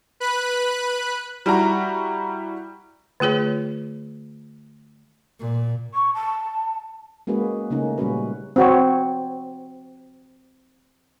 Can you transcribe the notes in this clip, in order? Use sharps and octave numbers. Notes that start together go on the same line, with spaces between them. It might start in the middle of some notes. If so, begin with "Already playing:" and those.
B4 B5 F#6
G3 E4 F#4 A#5
D3 A3 F4 G#4 C#5
A#2
C#6
A5
G#3 A#3 C#4 F#4 G#4 B4
C#3 A3 A#3 C#4 D#4
A#2 G3 G#3 C#4 F#4 B4
C4 F#4 C#5